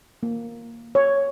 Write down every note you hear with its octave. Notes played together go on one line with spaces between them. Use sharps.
A#3
C#5